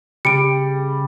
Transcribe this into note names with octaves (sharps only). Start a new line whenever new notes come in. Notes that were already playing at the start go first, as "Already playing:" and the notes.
C#3 G3 C#7 D7